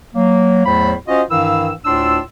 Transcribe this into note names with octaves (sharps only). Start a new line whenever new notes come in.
F#3 A#3
E2 A2 F#3 A3 C5 B5
C#4 F4 F#4 C5 D#5
G2 D#3 E3 E4 F5 E6
D2 A2 D4 F4 C6 E6